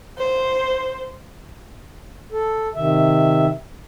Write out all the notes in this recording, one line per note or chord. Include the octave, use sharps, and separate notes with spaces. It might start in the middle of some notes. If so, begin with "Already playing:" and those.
C5
A4
C3 D#3 E5